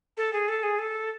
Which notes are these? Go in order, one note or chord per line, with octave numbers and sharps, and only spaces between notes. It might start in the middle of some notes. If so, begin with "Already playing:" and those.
A4
G#4
A4
G#4
A4